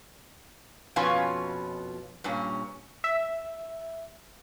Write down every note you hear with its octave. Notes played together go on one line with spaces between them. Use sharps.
F2 B2 C#4 F4 B4 G#5
G2 A#2 C#4
E5